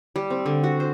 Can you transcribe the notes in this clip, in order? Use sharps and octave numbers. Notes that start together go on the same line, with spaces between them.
G3
C4
D3
F#4
C5